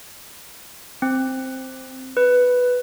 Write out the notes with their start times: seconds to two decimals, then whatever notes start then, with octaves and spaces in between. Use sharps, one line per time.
1.02 C4
2.17 B4